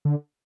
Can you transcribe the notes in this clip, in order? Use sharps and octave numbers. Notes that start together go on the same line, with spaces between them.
D3